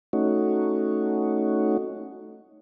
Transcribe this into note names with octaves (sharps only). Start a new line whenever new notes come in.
A3 C#4 D#4 F#4